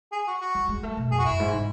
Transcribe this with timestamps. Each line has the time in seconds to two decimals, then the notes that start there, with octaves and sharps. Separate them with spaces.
0.12 G#4
0.27 F#4
0.41 F#4
0.55 F#3
0.69 G#3
0.83 A3
0.97 B2
1.11 F#2 G#4
1.18 F#4
1.25 F#2 E4
1.39 G#2
1.53 C#3